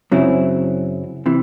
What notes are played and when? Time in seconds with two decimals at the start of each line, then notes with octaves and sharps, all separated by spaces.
0.11 F#2 C#3 F#3 C4 E4
1.26 C3 E3